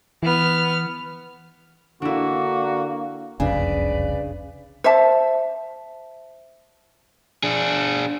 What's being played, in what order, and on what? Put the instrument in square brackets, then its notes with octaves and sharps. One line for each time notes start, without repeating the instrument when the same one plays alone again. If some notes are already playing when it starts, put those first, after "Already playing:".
[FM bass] E3 [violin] B3 F6
[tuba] D3 [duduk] A#3 [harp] D4 E4 [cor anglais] F#4
[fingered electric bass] F#1 C2 F2 [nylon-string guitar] C#3 [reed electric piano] D4 G#5 [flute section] B4 D5
[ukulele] C5 E5 A5
[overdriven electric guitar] D4 G#4